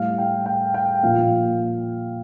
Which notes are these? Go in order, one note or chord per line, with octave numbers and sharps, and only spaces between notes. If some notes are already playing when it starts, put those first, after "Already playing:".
Already playing: A2 G3 F5
G5
G5
G5
A#2 F3 F5